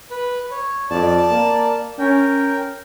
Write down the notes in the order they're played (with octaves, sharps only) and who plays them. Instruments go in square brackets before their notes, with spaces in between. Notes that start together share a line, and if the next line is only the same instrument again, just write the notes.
[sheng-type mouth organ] B4
C#5
[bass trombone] F2 [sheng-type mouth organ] D5 A5
[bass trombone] A#3
[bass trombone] C#4 [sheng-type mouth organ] A#4 G5